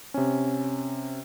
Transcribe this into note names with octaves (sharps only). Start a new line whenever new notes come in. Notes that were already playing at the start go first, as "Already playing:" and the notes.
C3 C#4